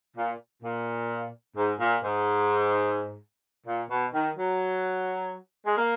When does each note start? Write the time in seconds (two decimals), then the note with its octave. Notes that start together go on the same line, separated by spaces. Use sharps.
0.16 A#2
0.62 A#2
1.56 G#2
1.80 A#2
2.03 G#2
3.66 A#2
3.89 B2
4.14 D#3
4.37 F#3
5.66 G#3
5.77 A#3